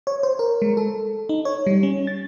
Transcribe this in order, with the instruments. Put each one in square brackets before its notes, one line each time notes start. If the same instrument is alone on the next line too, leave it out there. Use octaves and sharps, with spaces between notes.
[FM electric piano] C#5
C5
A#4
G#3
A4
D#4
C#5
G3
C#4
A6